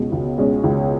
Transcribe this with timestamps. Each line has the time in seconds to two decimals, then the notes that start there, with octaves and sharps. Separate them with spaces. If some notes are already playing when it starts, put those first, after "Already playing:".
Already playing: C#2 B2 G#3 C#4
0.12 C#2
0.38 B2 G#3 C#4
0.64 C#2